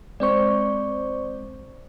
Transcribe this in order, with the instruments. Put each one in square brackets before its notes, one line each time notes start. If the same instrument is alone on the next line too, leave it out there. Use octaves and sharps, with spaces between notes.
[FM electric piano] G#3 C4 C5 [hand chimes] D5 C#6